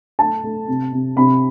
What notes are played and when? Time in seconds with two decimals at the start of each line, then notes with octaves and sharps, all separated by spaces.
0.19 A3 A5
0.43 A3
0.68 C3
0.92 C3
1.16 C3 B5